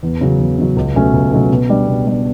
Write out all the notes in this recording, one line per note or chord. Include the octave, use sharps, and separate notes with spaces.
E2
C#3 F#3
E2
C#3 F#3
C#2
B2 F#3 A3 C#4
C#2
B2 F#3 A3 C#4
B2
G3 D4
B2
G3 D4